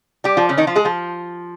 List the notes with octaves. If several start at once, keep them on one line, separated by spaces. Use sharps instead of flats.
G3 G4
F3 F4
C#3 C#4
D#3 D#4
F3 F4
G#3 G#4
F3 F4